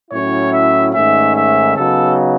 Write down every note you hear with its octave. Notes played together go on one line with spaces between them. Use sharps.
A2 F#3 C#4 E4 C#5
E5
G#2 D#3 A3 C#4 E5
E5
C#3 F#3 B3 D#4 A4